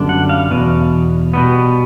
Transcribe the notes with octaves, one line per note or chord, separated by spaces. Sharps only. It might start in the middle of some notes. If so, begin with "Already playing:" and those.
Already playing: F#2 D3 G3 B3 D4
F#5
F5
E2 B2
B2 G3 B3